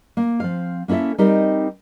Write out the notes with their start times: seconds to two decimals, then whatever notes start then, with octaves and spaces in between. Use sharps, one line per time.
0.17 A#3
0.40 F3 C4 F5
0.88 A#3 C#4 E4 A4 E5
1.18 G3 C4 D#4 G4 A#4 D#5